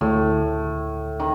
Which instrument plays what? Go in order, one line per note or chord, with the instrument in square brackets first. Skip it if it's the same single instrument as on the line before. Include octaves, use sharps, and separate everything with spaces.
[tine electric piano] D2 [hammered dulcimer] A2
[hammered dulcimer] D#3